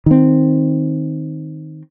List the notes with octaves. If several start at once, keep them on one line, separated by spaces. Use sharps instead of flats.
D#3 C4